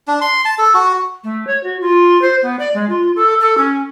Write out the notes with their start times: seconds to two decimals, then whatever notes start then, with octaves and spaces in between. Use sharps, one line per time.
0.08 D4
0.21 C6
0.45 A5
0.59 A4
0.74 F#4
1.24 A3
1.47 C#5
1.63 F#4
1.81 F4
2.22 C5
2.43 B3
2.59 D5
2.74 G#3
2.89 F4
3.16 A4
3.40 A4
3.58 C#4